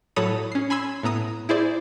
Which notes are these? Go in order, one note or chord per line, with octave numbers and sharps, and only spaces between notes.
A2 F#3 A4 C#5 B5 D#6
C#4 C7
G#5 B5 C6 E6 G#6
A2 B3 A#5 D#6
E4 G#4 C5 D5